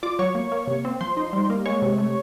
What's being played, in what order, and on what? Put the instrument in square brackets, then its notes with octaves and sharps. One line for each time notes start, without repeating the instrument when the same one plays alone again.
[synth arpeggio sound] F4 D5 D6
F#3 C#5 C#6
A#3
A#3
C3
C4
F3 C5 C6
D#4
G3
A#3
G#3 C#5 C#6
C3
A3